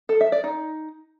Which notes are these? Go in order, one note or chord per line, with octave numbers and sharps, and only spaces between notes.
A4
E5
D5
D#4